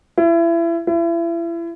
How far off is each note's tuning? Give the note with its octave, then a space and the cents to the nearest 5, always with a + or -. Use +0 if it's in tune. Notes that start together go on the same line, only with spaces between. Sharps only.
E4 +30
E4 +35